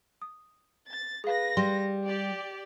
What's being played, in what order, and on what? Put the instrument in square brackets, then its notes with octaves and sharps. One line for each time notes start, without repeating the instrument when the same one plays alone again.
[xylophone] D#6
[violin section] A6
[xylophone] G#4 F5 [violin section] B4 A#6
[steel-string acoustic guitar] G3 [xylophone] C6
[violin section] G4 D5